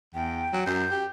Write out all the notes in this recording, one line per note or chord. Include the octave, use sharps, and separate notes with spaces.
E2 G5
F#3
F#2 G6
G4